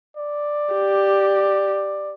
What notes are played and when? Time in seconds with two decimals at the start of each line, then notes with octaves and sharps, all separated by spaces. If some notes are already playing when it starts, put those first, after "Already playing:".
0.17 D5
0.73 G4